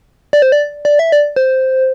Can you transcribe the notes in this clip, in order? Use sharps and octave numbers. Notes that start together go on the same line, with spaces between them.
D5
C5
D5
D5
E5
D5
C5